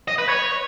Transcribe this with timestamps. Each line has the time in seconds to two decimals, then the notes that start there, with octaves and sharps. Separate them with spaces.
0.08 D#5
0.18 B4
0.29 C#5